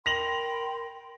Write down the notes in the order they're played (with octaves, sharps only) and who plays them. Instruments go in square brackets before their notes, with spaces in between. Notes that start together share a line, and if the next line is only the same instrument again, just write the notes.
[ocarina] A#4 [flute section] G5 B5 C6 [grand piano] A#6 F7 F#7